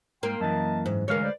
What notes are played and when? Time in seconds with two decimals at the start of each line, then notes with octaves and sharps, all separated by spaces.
0.23 G#2 A#3 G5 C6
0.41 F#2 E3 D#5 A5
0.86 G#2
1.08 D2 E3 G#3 A#4 C#5 F5
1.23 B4 C5 D5